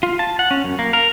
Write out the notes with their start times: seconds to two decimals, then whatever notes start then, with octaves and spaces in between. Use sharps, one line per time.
0.03 F4
0.19 A5
0.39 F#5
0.51 C#4
0.64 F#2
0.79 A#3
0.93 A#4